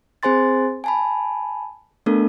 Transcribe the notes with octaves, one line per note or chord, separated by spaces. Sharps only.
C4 G#4 C5 G#5 C6 A6
G#5 A5 B5
A3 B3 D4 A4 A#4